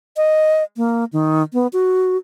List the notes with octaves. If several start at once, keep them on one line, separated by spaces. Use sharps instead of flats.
D#5
A#3
D#3
B3
F#4